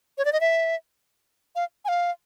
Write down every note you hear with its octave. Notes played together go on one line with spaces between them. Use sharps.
C#5
D5
D#5
E5
F5
G#5
F5